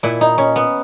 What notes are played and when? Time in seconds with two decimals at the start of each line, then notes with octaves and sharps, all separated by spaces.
0.03 A#2 E4
0.21 D#4
0.38 C#4
0.56 B3